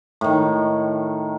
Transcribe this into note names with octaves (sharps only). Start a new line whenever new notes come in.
A2 D#3